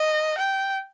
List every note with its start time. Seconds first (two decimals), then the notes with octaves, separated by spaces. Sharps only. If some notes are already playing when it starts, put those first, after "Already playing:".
Already playing: D#5
0.38 G5